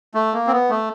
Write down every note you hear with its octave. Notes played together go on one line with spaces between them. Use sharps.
A3
A#3
C4
B3
A3